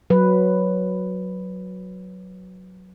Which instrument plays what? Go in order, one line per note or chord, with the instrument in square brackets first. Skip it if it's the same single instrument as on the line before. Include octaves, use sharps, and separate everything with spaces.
[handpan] F#3 B4